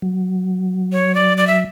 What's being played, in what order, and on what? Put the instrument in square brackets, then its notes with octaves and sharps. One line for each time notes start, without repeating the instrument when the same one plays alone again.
[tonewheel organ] F#3
[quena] C#5
D5
D5
E5